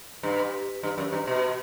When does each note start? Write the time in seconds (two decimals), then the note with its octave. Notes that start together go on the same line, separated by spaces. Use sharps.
0.23 G2
0.83 G2
0.98 F#2
1.13 G2
1.27 B2